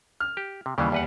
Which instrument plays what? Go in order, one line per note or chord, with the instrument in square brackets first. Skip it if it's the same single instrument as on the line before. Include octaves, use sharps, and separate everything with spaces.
[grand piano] F6
[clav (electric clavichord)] G4
C3
[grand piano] D#2 G3 [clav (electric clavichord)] C#3 E3
[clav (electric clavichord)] E2 B4 F#5